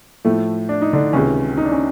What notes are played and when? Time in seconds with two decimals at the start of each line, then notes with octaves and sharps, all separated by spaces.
0.25 A2 F3 A3
0.69 D4
0.82 D#4
0.93 D3 D4
1.13 C#2 C3 D#3 C#4
1.57 D#4
1.65 D4
1.72 C#4